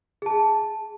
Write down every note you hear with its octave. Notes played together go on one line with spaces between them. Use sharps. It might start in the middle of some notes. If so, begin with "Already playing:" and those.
G#4 A5